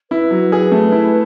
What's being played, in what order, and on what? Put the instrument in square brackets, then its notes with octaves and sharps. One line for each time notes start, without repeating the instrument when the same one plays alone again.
[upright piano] E4 [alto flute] B4
[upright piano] F#3
G#4
A3
E4